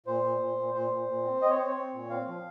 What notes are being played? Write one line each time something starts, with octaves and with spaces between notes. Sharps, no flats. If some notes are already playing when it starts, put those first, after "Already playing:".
A#2 C5
A#2
A#2
A#2
A#2 C5
A#2
A#2
C4
C4 D#5
C#5
C4 C5
C#5
C4
A#2
C4 F5
F3